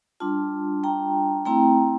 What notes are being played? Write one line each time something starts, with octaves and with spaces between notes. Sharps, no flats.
G3 D4 F4 A5 C6
G5 A#5
A3 C4 E4 G5 A#5